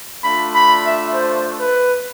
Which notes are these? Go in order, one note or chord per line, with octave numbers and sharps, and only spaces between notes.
A3 D4 F4 B5
B5
E5
C5
B4